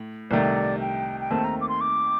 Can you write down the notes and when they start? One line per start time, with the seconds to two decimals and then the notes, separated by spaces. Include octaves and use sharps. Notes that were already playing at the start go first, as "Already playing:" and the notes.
Already playing: A2
0.31 C2 C3 D#3 A3 D5
0.81 G5
1.20 G5
1.31 D#2 D#3 A3 C4 A5
1.44 A#5
1.61 D6
1.69 C6
1.81 D6